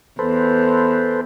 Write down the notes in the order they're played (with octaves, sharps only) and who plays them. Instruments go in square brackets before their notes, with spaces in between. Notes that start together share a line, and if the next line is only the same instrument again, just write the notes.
[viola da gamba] E2 [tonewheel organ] A4 B4 C5